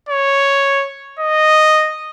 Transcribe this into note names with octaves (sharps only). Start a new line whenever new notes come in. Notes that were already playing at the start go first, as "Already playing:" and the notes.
C#5
D#5